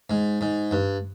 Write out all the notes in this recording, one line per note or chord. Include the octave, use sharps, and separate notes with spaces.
G#2
G#2
G2